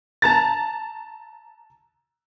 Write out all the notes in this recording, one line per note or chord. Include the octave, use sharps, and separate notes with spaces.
A5 A#5 A6